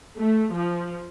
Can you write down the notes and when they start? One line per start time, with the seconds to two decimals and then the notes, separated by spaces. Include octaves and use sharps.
0.18 A3
0.53 F3